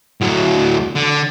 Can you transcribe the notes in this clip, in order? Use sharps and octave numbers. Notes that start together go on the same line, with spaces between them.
D2 F#3
D3